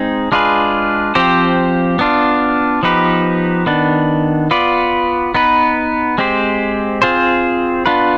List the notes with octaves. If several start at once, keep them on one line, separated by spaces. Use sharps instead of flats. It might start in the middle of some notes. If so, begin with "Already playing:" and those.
Already playing: G#3 C4 D#4 G#4
G#3 D4 F4 G#4 B4
F3 C4 G4 C5
B3 D4 F4
F3 B3 D#4 G4 B4
D#3 B3 D4
B3 F4 B4 D5
B3 D#4 B4
G#3 C4 G4 C5
C4 F4 G#4 C5
B3 D4 F4 B4